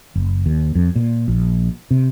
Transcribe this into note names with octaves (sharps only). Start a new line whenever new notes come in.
F#1
D#2
F2
A#2
A#1
C3